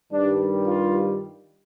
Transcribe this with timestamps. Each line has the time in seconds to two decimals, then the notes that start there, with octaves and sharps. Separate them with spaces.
0.11 G2 D#3 G3 D4
0.65 F4